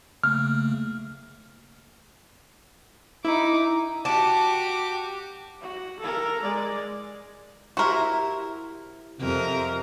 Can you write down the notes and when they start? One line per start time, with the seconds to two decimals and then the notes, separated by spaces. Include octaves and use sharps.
0.24 C#3 A3 A#3 F6
3.25 D#4 E4 D6
4.05 F#4 G4 A5 D6
5.61 F#4
6.00 A4 A#4
6.43 G#3 D5
7.77 E4 F#4 G4 A#4 C5
9.20 F2 C3 A#4